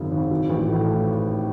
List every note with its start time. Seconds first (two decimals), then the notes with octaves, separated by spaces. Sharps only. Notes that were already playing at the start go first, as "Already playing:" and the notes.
Already playing: G#1 F#2 C#3
0.12 G#1
0.31 F#3
0.49 A1
0.69 A2